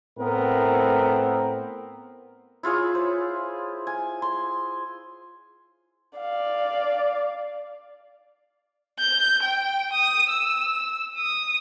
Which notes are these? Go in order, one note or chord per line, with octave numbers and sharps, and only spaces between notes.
A2 B3 C4 A#4
E4 F4 G#4 C#5
C5
G#5
C6
D5 F5
G6
G5
D#6
E6
D#6